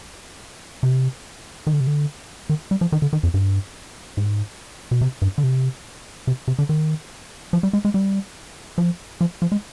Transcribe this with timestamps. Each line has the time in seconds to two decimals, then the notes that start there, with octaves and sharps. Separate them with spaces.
0.83 C3
1.67 D#3
1.73 D3
1.80 C3
1.87 D3
2.49 D#3
2.71 G3
2.81 F3
2.92 D#3
3.02 D3
3.13 D#3
3.23 F2
3.34 G2
4.17 G#2
4.91 B2
5.01 C3
5.22 G2
5.38 D3
5.44 C3
6.27 C3
6.48 C3
6.59 D3
6.69 D#3
7.53 F3
7.63 G3
7.73 G#3
7.85 G#3
7.94 G3
8.78 F3
9.21 F3
9.42 F3
9.52 G#3